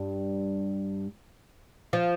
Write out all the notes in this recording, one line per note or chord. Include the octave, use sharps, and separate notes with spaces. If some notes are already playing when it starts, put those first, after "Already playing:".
Already playing: G2 G3
F3